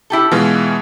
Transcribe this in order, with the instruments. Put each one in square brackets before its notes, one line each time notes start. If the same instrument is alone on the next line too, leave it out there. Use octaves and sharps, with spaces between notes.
[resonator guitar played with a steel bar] E4 G4 A4
[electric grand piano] B2 E3 G#3 [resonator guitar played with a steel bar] F4